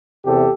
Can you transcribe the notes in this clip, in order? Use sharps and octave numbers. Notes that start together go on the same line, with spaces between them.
E2 C3 G4 A4